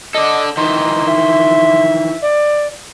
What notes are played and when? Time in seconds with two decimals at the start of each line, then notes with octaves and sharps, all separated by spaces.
0.14 A4 D5 D#5
0.57 D#3 E3 D#4 C6
1.08 E5
2.22 D5